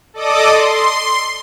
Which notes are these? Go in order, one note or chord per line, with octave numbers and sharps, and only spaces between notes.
A4 D5 D#5 D6 D#6
C6